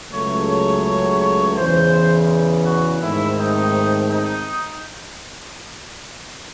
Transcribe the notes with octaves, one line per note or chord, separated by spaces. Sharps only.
C#2 C#3 F#3 A3 C#5
C#5
C#5
C#5
E2 C#3 E3 C5
F#4
G#2 D#3 A3 C4 E4
D#4
D#4